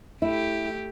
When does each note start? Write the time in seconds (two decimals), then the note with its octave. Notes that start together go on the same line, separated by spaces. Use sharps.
0.22 A3 E4 G4